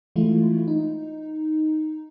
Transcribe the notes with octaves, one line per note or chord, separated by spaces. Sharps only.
E3 G#3 A3 E4 F4
D#4